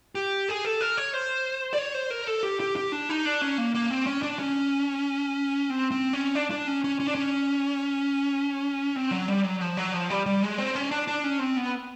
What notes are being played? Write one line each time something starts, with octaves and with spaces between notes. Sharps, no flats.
G4
G#4
A4
A#4
C#5
C5
D5
C#5
C5
A#4
A4
G4
G4
G4
D4
D#4
D4
C#4
A#3
A#3
C4
C#4
D4
C#4
C4
C4
C#4
D4
D4
C#4
C#4
C#4
D4
C#4
C4
F#3
G3
F#3
F3
F#3
F3
G3
G3
G#3
C4
C#4
D4
D4
C#4
C4
B3